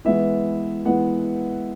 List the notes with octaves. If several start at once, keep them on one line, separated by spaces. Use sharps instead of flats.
E3 G#3 B3 E4 E5
E3 G#3 B3 E4 F#5